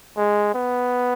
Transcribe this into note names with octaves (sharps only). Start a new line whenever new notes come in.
G#3
B3